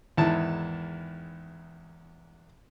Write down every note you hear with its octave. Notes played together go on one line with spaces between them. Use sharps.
E2 G#2 D#3 E4 A5